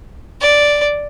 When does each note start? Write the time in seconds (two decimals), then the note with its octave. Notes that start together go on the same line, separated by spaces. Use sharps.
0.41 D5